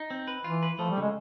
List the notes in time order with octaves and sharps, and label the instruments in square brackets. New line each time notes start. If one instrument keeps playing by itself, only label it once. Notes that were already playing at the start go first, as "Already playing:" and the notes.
Already playing: [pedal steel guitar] D#4
C4
B4
[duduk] E3 [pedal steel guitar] F4
[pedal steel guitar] B4
[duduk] F3 [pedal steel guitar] A3
[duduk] G3
[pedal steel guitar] C#3 [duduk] G#3